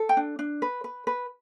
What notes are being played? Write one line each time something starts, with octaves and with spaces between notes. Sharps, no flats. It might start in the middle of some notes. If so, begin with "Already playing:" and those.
Already playing: A4
G5
D4
D4
B4
B4
B4